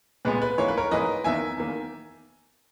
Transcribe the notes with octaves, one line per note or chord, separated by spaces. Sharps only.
A#2 G#3 B3 B4
B4
G#2 E3 A#3 C#5
B4
A#4 C#5
G#2 E3 A#3 B4 D#5
E2 D#3 A#3 E5 G#5
E2 D#3 A#3